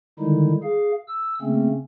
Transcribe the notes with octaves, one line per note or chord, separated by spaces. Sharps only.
D3 D#3 G3 G#3 D#4 E4
G#4 F5
E6
C#3 A3 A#3 C4 C#4